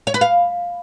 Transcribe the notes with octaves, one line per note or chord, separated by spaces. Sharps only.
C#5
B4
F5